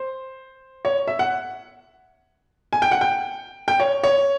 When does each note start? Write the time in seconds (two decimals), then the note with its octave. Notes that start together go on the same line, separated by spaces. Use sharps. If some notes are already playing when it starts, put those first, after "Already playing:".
Already playing: C5
0.85 C#5
1.07 E5
1.19 F#5
2.73 G#5
2.82 G5
2.91 F#5
3.01 G5
3.68 G5
3.80 C#5
4.03 C#5